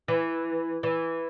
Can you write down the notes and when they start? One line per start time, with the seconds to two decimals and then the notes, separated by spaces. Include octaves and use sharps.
0.08 E3
0.83 E3